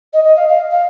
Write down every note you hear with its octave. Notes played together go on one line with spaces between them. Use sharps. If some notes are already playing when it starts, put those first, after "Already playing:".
D#5
D#5
F5
F5
F5